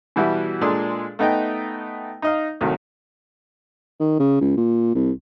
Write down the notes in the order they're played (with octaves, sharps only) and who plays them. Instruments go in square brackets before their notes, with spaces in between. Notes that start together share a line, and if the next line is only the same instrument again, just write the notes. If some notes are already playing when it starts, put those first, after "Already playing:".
[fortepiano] B2 E3 G3 B3 E4 F#4
A#2 G#3 D4 A4 C6 D#6
A3 B3 D#4 D#5 G5
D#4 D#5 F5
C2 A2 D#3 F#3 A3
[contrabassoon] D#3
C#3
C#2
A#2
C2